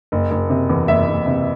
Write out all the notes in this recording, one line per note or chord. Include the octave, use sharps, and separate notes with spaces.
F#1
F#1
C3
E2
F#1 E5
F#1
C3